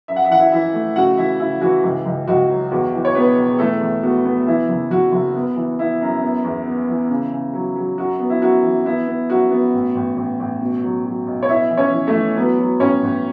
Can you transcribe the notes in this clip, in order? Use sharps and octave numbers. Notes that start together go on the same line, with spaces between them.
F#2 E5
F#5
E5
E3 F#5
E4 E5
E3 E4 E5
A3
C#3 F#4 F#5
E3 E4 E5
C#3 E4
E3 F#4
C#2
C#2
C#2 F#4
F#3
E2 F#4
E3
C#5
E1 B3 B4
E1
E3 A3 A4
E2
B3 F#4
B3
E3 E4
F#1
F#1 F#4
F#1
B3
E3
B3 E4
F#2
B3
E2
B3
E3
C#3
C#3
F#3
F#3
F#2 F#4
B3
E4
F#2 F#4
E3
B3 E4
B3
F#2 F#4
B3
A1
A1
A1
A1
B2
F#3
F#3
B1
C#5
B3 E4 E5
E3
C#4 C#5
E3
A3 A4
E3
F#3 B3 B4
F#3
A1 C#4 C#5
A1